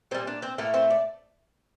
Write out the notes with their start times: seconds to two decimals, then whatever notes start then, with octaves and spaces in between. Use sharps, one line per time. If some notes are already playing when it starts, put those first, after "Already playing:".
0.11 A#2 G3 C4 C5
0.27 D4 D5
0.42 C4 C5
0.58 A2 A3 A#3 A#4
0.74 C4 C5
0.90 D5